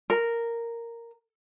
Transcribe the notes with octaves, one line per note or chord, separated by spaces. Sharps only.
A#4